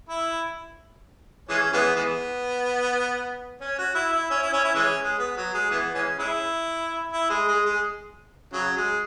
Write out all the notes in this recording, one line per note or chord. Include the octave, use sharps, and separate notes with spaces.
E4
E3 G#3 C#4
E3 G#3 B3
E3 G#3 B3
C#4
F#4
E4
E4
C#4
E4
C#4
E4
E3 G#3 C#4
G#3
B3
F#3
G#3
E3 G#3 B3
E3 G#3 C#4
G#3 C#4 E4
E4
G#3
G#3
G#3
C#3 F#3
G#3